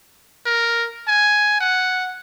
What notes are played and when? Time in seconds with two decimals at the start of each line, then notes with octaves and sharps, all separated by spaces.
0.46 A#4
1.08 G#5
1.60 F#5